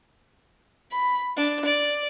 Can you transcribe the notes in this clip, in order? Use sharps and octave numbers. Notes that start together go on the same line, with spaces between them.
B5
D4
D5